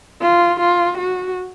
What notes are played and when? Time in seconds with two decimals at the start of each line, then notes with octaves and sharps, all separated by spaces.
0.21 F4
0.60 F4
0.97 F#4